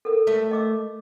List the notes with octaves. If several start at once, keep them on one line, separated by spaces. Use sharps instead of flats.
A4 A#4
A3 E5
D#5 D6 E6